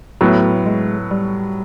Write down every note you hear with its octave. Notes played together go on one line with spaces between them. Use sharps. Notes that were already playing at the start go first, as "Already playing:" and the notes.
A2 F#3 A3 B3
G#3
G3